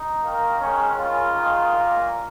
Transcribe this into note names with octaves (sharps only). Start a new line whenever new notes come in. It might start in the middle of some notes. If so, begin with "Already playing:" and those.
Already playing: D#4
D#3 A#3
D#3 G#3 C#4
C#3 A#3 F4
D#3 G#3
A#2 A#3